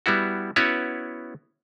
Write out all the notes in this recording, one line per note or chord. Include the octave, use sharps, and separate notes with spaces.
G3 B3 E4 F#4
B3 C#4 E4 F#4 B4 C#5